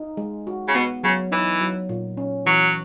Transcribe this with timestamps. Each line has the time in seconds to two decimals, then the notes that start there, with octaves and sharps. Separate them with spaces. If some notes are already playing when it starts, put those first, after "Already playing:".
Already playing: D#4
0.17 G#3
0.47 F#4
0.68 C#3
0.75 B2 B3
1.03 C#3 F#3
1.31 E3 D#4
1.61 F#3
1.89 A#2
2.17 C#4
2.46 E3 F#3